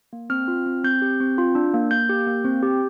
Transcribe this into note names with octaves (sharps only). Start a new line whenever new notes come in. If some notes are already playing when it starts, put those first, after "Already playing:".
A#3
C4 F6
F4
C4
C4 G6
G4
C4
F4
D4
A#3
A#3 G6
G4
A#3
C4
G4